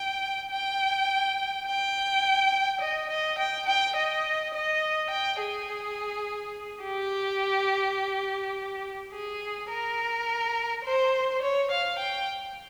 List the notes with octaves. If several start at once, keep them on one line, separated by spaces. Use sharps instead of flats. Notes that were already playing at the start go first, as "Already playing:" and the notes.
Already playing: G5
G5
G5
D#5
D#5
G5
G5
D#5
D#5
G5
G#4
G4
G#4
A#4
C5
C#5
F5
G5